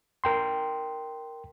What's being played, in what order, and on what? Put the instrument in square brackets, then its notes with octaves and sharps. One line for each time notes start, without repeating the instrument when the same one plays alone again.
[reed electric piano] A#4 G5 C6